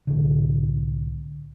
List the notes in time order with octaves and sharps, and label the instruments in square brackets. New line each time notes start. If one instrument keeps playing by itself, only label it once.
[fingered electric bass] C2 A2 D3